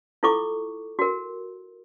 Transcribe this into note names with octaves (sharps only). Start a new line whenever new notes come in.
E4 F4 A4 C#6 D6
F#4 A#4